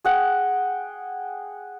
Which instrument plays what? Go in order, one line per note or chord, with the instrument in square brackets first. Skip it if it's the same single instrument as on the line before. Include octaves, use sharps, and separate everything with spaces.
[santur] G#4 F#5 G5